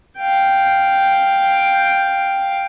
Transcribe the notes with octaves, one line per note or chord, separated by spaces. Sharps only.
F5 G5